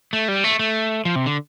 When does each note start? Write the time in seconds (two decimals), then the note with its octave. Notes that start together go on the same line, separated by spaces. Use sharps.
0.13 A3
0.28 G3
0.44 A3
0.59 A3
1.05 F3
1.16 C3
1.26 D3